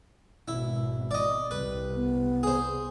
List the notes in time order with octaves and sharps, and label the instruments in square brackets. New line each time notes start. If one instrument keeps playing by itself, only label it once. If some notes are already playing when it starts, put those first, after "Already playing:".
[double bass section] G#1 B2 [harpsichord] E4
[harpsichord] D5 D#5
[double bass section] C2 [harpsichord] B4
[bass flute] B3
[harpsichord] G#4 C5